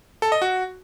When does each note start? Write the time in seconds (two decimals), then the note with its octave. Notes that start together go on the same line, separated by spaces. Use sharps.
0.22 A4
0.32 D#5
0.42 F#4